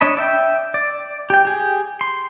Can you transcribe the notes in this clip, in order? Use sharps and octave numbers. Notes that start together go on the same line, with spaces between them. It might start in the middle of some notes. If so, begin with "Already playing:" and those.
D4 C#5 D#5 A5 B5
D5 E5 G5
D5
G4 G5
G4 G#4
C6